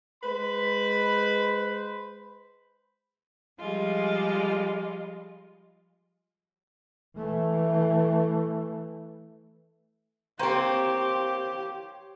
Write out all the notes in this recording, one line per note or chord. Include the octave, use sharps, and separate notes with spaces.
G#3 B4 C5 B5
F3 G3 G#3 F4
E3 A3
A#3 C4 G4 C5 C#5